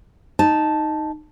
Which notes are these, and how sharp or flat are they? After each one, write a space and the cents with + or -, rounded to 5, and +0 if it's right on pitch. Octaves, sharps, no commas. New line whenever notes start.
D#4 +0 A5 -5